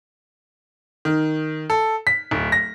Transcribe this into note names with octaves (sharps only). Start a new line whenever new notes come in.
D#3
A4
B6
D1
A#6